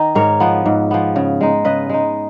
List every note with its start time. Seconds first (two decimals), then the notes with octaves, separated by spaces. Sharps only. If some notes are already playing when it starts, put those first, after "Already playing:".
Already playing: D#3 D#4
0.15 G#2 A#4 C#5
0.40 F3 B3
0.66 G#2
0.91 F3 B3
1.16 C#3
1.41 G#3 D#4
1.65 C#3 B4 D#5
1.90 G#3 D#4